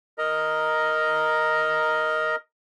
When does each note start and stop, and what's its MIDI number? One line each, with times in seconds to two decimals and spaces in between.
0.18 2.36 70
0.18 2.36 75
0.18 2.36 82